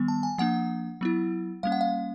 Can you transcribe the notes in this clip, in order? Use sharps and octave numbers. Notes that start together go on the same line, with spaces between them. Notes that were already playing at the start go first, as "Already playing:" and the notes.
Already playing: D#3 G3 B3
A5
G#5
F3 A#3 D4 F#5
F#3 B3 E4
G3 A#3 C#4 F5
F#5
F5